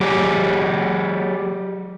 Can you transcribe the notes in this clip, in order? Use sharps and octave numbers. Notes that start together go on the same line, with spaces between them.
F#3 G4 G#4